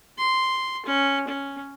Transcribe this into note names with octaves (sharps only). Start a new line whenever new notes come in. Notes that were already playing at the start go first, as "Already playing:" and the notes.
C6
C#4
C#4